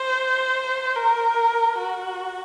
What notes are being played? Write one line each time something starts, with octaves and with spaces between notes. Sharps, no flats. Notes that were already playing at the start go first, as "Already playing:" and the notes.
Already playing: C5
A#4
F#4